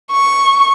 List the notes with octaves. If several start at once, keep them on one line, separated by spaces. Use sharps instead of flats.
C#6